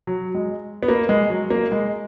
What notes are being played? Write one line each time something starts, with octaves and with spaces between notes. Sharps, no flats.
F#3
G#3
B3
A#3
G#3
F#3
A#3
G#3